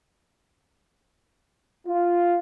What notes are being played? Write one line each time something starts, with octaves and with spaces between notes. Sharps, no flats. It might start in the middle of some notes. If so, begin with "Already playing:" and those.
F4